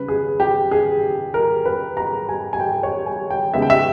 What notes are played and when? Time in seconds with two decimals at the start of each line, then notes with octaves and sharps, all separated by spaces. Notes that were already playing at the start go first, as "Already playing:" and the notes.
Already playing: C#3 G3 C#4 B4
0.08 G#4
0.40 G4
0.71 G#4
1.34 A#4
1.66 B4
1.97 A#5
2.29 G#5
2.53 G#5
2.60 G5
2.83 C#5
3.06 G#5
3.30 G5
3.54 C#3 G#3 B3 D#4 E5
3.62 G5
3.70 E5